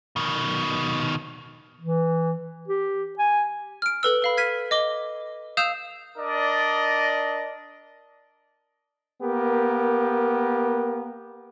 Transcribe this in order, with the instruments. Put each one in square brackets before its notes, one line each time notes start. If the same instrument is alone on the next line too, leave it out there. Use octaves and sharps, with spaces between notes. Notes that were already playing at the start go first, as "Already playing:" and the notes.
[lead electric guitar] B2 D#3
[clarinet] E3
G4
G#5
[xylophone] F6 D7
A4 B4 E6
B4 F5 B5
F6 G#6 B6 D#7
D#5 D6 G7
F5 D#6 E6 G6 E7 F7
[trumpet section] D4 A#4 D5 D#5
[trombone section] A#3 B3 G4 A#4